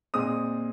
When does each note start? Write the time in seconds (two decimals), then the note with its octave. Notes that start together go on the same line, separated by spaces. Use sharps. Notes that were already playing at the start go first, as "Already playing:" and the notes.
0.14 A#2 G#3 C4 D#6